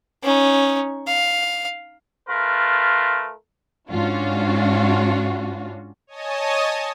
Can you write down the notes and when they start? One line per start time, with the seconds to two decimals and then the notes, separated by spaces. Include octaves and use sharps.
0.23 C#4 D#4
1.07 F5
2.29 A3 F4 A#4 B4
3.90 G#2 C#4 D4 F4 F#4
6.07 C#5 D#5 G#5 A5 D#6